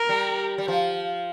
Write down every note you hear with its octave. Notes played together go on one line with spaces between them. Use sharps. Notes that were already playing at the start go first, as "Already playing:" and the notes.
Already playing: A#4
G3
G3
F3